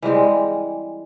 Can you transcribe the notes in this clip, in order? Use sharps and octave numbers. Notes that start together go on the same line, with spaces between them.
E3 G3 G#3 C4